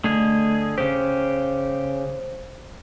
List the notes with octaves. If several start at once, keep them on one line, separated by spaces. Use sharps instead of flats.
D3 A3 G#4
C#3 G4 C5